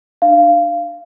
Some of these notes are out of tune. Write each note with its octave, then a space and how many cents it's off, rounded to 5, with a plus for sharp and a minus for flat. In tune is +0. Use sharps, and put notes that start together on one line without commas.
D4 +30 F5 -15